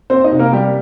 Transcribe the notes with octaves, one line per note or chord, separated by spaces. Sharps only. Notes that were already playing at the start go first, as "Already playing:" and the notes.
A#3 C4 C5
D#4 D#5
C3
A#3 A#4
G3 A#3 G4